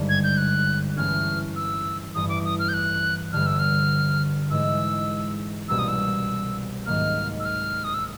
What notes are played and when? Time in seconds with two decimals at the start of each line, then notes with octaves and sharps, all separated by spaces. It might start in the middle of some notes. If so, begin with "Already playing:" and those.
Already playing: G#1 G2 D3 G3
0.09 G#6
0.24 G6
0.37 F#6
0.97 G2 E3 A3 C#4 F6
1.56 E6
2.15 A1 G2 E3 D#6
2.29 D6
2.45 D#6
2.59 F6
2.69 G6
2.74 F#6
3.32 G1 G2 D3 F6
3.46 E6
3.59 F6
4.50 G#2 E3 G#3 E6
5.69 C2 B2 G3 A#3 C#4 E6
5.79 D#6
5.88 E6
6.86 G#2 D#3 F#3 A#3 F6
7.40 E6
7.45 F6
7.84 D#6
7.94 E6